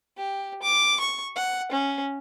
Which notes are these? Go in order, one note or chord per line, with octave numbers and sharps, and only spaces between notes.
G4
D6
C#6
F#5
C#4